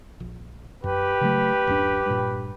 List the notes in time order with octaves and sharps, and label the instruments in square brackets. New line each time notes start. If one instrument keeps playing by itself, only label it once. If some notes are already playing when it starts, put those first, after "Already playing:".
[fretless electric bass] A#1
[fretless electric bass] F#2 [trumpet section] G4 B4
[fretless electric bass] C#3 F#3 A3
D1 F#2 D4
G2 A#2